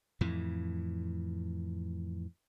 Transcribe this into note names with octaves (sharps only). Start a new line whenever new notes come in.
F2 A2 E3